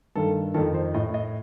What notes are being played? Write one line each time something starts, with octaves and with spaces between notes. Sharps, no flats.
G2 D#3 A4
F2 D#3 A4
C5
A2 D#5
D#5